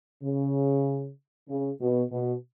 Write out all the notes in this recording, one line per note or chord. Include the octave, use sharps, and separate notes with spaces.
C#3
C#3
B2
B2